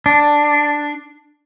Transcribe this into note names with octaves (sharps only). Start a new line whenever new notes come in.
D4